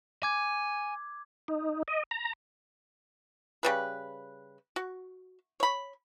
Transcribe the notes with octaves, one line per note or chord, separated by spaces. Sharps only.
G#5 D6 G#6
D#4
D#5
A#5
C#3 G3 B4
F#4
C#5 B5